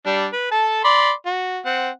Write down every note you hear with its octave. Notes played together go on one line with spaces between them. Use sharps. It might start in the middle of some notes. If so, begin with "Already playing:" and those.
G3 D4
B4
A4 A5
D5 B5 C6
F#4
C4 F#5